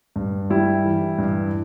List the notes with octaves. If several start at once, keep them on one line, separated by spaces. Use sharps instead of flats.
G2
G3 E4
E3
G2